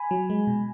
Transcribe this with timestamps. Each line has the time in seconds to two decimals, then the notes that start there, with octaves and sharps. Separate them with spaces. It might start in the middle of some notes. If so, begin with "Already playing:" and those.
Already playing: G#5 B5
0.11 F#3
0.30 G#3
0.47 B2